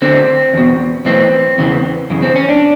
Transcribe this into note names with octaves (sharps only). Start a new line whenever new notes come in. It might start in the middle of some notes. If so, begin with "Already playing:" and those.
D2 D3 C4
E2 B2
B1 A2 E3 C4
E2 C#3 E3
F#2 C#3 E3
C4
C#4
D4